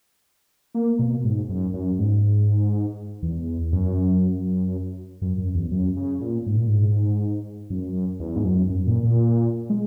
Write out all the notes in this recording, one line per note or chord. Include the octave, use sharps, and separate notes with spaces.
A#3
B2
G#2
F#2
F#2
G#2
E2
F#2
F#2
F#2
E2
F#2
C#3
A#2
G#2
A#2
G#2
F#2
E2
G#2
F#2
F#2
A#2
A#2
G#3